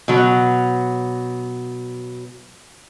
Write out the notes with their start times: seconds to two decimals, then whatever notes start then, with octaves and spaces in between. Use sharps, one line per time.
0.08 B2 F#3